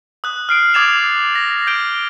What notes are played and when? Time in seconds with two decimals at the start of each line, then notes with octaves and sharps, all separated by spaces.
0.24 D#6 F#6
0.49 F6 C7 D7
0.74 D6 D#6 G#6 A6 E7 F7
1.35 A#6
1.67 G6 D7 G7